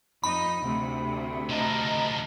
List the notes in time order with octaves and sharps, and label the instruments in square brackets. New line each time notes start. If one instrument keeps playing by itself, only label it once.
[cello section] F2 D#4 D#5 [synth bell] B5
[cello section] D2 C3 A3
[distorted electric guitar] D3 F3 [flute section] D#5 A5 A#5